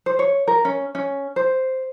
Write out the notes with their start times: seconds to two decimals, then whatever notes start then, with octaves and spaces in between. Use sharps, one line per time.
0.06 C5
0.19 C#5
0.48 A#4
0.65 C#4
0.95 C#4
1.36 C5